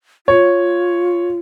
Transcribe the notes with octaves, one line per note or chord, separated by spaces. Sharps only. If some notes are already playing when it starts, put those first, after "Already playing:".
F4 C#5